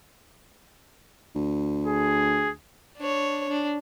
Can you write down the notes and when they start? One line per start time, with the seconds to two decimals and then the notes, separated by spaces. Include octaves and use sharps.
1.36 D2
1.87 G#4
2.97 D4 C#5
3.49 D4